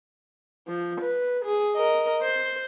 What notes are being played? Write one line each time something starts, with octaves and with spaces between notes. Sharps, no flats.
F3
B4
G#4
A#4 D#5
C5